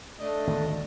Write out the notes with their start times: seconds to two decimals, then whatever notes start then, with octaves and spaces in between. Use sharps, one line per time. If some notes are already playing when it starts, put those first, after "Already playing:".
0.19 A3 D4 D#5
0.47 G#1 D2